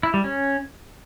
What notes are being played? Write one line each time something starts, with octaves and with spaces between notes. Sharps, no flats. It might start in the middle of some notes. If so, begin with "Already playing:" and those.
E4
G3
C#4